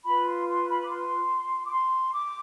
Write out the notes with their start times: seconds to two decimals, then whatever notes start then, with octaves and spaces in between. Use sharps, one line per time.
0.06 F4 B4 B5
0.26 C6
0.47 C6
0.68 B5
0.84 D6
0.89 C6
1.64 D6
1.70 C6
2.12 D6